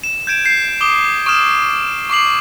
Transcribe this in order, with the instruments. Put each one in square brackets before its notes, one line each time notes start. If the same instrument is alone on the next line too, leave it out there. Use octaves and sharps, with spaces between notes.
[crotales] E7
G6 G#6 D7 E7
G6 C7
D6 D#6 G7
C#6 D#6 F6 E7
C#6 D6 C7 F#7